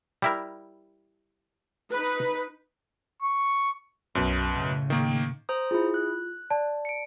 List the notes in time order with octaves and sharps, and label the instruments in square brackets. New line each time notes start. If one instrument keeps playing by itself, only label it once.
[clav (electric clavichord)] G3 E4 A#4
[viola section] D#4 B4
[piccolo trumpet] C#6
[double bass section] B1 [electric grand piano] F#2 B2
[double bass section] A2 C#3
[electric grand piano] D#3 A#3
[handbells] C5 A#5 D#6
[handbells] E4 G#4 [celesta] F4
[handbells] F#6
[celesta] D5 A5
[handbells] C#7 D7